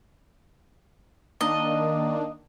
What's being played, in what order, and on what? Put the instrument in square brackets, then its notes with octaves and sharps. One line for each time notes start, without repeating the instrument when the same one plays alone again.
[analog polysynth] D#3 A#3 D4 [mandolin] D#5